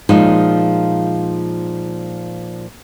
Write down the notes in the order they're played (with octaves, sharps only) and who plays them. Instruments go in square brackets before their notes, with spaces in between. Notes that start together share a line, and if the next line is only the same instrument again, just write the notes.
[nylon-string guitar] A#2 F3 G#3 D#4